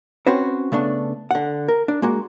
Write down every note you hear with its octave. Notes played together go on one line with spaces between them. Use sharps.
C4 C#4 F#4 B4 C5
C#3 A3 B3 D4
D3 F#5
A#4
D4
G#3 A#3 F#4